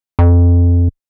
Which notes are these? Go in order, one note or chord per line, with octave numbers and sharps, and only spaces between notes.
F2